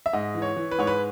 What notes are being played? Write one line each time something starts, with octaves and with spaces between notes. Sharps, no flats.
E5
G#2 D#5
E3
C#5
E3
B4
G#2 C#5
B4